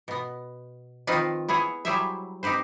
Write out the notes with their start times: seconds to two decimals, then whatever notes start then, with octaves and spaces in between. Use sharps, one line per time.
0.08 B2 B3
1.07 D#3 F3 C4 D#4 F4 B4
1.48 B3 E4 G#4 C#5
1.85 F#3 G3 E4 G#4 C5 E5
2.43 C4 D#4 G4 B4 C5